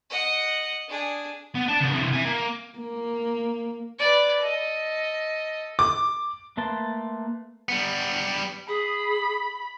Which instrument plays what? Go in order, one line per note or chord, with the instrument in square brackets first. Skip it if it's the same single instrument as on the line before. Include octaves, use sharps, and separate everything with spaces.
[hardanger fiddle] D#5 F#5
D4 G#4
[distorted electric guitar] B3
D5 A5
C#3 B3
C3 E3
E5 G#5
A#3
[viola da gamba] A#3
[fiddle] B4 D5
A4 D#5
[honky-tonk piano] D6
[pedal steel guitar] A3 A#3 B4 A5 C6
[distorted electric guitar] G3 B3
[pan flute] G#4 [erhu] B5